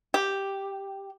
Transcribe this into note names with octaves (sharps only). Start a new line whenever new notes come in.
G4